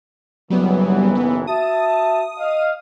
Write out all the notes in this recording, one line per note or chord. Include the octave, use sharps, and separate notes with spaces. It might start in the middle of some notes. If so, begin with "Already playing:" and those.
F#1 B1 E3 F#3 G3 B3
B3
F#4 E5 A5 D#6
D#5 F5